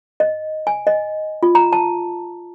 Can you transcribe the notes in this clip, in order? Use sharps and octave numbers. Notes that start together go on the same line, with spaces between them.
D#5
G#5
D#5
F4
A#5
A5